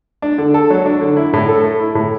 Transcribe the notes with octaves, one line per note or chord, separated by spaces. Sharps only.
D4
D3
A4
F#3
D4
D3
E4
A2
A4
A3
E4
A2